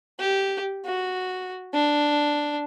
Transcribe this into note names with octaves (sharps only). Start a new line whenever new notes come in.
G4
F#4
D4